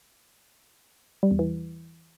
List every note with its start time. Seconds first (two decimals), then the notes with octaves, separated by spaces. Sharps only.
1.23 G3
1.31 E2
1.39 E3